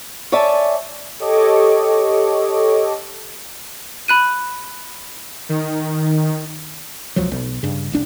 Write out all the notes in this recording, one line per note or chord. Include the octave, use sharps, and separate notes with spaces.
C#5 D5 E5 G#5 A5
G4 A4 C#5 D#5 C#6 D6
B5 F#6 D#7
D#3
E1 C#2 F3 F#3
B1
G2 C#3
F1 C2 D4